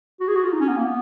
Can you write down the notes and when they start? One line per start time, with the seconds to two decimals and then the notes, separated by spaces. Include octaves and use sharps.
0.20 F#4
0.28 G#4
0.36 F#4
0.44 F4
0.53 D#4
0.60 C#4
0.69 B3
0.76 A#3
0.85 B3